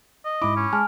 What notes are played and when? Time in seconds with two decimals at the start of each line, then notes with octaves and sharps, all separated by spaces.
0.25 D#5
0.42 G#2 E4 B5 D6
0.56 C#4
0.73 G#3 G#5 A5 F6